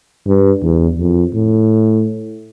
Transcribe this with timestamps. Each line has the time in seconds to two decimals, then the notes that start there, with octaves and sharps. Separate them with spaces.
0.27 G2
0.63 E2
0.99 F2
1.34 A2